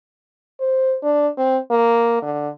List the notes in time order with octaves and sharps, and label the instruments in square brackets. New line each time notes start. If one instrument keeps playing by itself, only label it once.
[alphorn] C5
D4
C4
A#3
D3